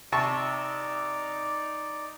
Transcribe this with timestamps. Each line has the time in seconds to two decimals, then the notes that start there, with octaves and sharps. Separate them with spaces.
0.12 C3 D#4 D5 A5 C#6